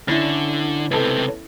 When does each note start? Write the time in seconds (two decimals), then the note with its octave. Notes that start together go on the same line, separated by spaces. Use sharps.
0.08 D3 C#4 E4 E5 A6 A#6
0.91 C#2 C3 B3 A4